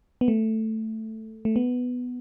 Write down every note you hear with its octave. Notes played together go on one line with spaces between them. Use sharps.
B3
A3
A3
B3